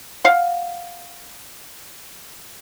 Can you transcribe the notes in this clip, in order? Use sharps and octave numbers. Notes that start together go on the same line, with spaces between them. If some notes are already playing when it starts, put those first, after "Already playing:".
F5 F#5